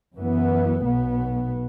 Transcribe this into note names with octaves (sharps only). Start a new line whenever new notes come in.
F#2 E3 B3
B1 B2 B3